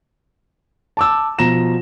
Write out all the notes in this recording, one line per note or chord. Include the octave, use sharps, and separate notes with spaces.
A5 D6 E6
B2 F3 A#5 A#6 E7